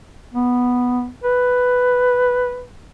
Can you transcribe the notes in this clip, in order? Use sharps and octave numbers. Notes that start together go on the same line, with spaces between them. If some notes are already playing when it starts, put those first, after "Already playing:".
B3
B4